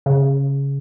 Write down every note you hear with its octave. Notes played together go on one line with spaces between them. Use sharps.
C#3